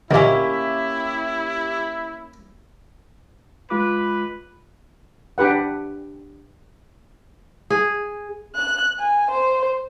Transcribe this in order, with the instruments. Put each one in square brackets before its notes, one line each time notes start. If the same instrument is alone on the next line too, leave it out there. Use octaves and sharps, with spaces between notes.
[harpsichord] D2 A#2 [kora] A#3 C#4 [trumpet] E4 [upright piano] G4 E5
[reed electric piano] G#3 F4 D6 [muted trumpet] B4
[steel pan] D4 G4 B4 F#5
[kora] G#4
[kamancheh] F#6
G#5
C5